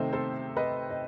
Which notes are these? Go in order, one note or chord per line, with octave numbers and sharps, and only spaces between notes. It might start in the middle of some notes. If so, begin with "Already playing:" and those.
Already playing: C3 D#3 A3 C4 C5 D#5 E5
A4 C5
B4 D#5
D#5